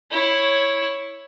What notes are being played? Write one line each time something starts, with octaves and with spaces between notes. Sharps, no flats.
E4 C#5